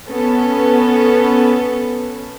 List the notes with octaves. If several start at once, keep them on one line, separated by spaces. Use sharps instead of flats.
B3 C#4 A4 B4